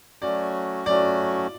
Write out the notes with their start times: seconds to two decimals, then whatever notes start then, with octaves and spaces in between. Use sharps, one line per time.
0.22 F#3 A3 C#4 F#4 D5
0.86 F#3 A3 C#4 F#4 D5